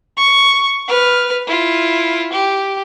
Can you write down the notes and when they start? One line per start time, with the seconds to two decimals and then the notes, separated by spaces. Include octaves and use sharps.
0.17 C#6
0.88 B4 F6
1.47 E4 F4
2.33 G4